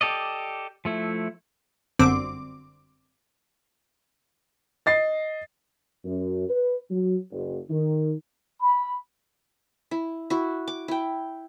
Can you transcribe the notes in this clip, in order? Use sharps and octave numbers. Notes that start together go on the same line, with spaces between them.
G4 A4 D5 D#5
F3 A3 E4
G1 F#2 D3 C4 D6
D#5 A6 C7
F#2
B4
F#3
F#1
D#3
B5
E4
E4 F#4
D6
E4 G5